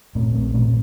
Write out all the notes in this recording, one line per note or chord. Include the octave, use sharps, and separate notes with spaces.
A#2 A3 C4
A#1 A3 C4
A#2 A3 C4